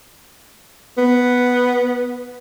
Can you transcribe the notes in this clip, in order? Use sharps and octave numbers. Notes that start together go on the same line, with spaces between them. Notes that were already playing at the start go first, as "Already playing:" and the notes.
B3